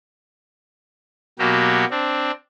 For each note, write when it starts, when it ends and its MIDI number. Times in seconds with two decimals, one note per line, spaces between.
1.39 1.85 47
1.39 1.85 54
1.39 1.85 58
1.39 1.85 66
1.39 1.85 67
1.90 2.31 60
1.90 2.31 62